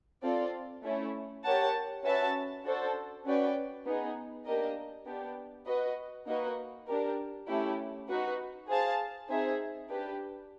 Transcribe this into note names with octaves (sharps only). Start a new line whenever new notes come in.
C4 F4 A4 D5 F5
A3 C#4 E4
G4 A#4 C#5 F#5 A5
C#4 F#4 B4 E5 A5
D4 F#4 A4 C5
C#4 F#4 B4 D5 G5
B3 D#4 G#4
A#3 D4 G4 A#4 D#5
B3 D4 G4
F#4 B4 D#5
A#3 D#4 F#4 B4 D#5
D4 G4 A#4
A3 C#4 E4 G4
D#4 F#4 B4
G#4 C5 F5 A5
C4 D#4 G#4 C5 E5
D4 G4 B4